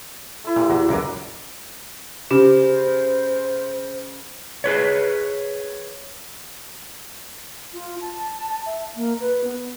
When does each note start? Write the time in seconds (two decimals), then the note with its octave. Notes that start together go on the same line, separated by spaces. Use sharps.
0.44 A3 E4
0.56 A#2 A#3 E4 G4
0.70 E2 F#4
0.89 C#2 F#2 A#3 D4 D6
2.31 C#3 G4 C5
4.64 G#4 B4 C#5
7.73 F4
8.01 A5
8.66 E5
8.96 A#3
9.20 B4
9.44 B3